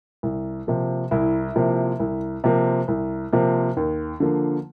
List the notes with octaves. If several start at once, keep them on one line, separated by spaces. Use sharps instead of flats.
C2
C3 F3 A#3
C2 E4
C3 F3 A#3
C2
C3 F3 A#3
C2
C3 F3 A#3
D#2
D3 F3 A#3